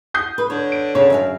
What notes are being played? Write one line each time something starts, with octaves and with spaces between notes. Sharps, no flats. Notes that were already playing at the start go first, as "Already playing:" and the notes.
D#6 G6 C7
B4
D3 C#5
D7
C#3 C#5
F#2 G#4 F5